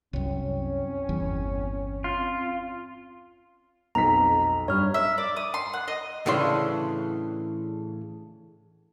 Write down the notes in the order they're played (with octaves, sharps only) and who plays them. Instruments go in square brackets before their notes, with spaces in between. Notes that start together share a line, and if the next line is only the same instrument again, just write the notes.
[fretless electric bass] C2 F#2 [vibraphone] C4 C#5 G5 [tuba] C#4
[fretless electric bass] G1 E2
[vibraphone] C4 [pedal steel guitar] F4
[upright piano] B1 F2 B6 [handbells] A#5
[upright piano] G2 [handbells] C#5 F6
[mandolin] E5
D5
D#6
C6
F#5
D#5
[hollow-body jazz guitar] A2 C#3 E3 D4 C6